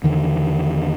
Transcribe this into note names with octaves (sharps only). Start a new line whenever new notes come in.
E2 B2 D3 D#3